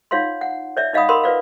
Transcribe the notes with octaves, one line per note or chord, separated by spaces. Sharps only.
D#4 F4 C#5 F5 F#5 C6
F#5
C#5 D5 E5
D#4 D#5 F5 F#5 B5 D#6
A#4 F#5 B5 C6 D#6
F4 B4 D5 F5